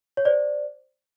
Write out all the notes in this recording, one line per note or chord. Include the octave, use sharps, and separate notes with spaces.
C#5
C5 D5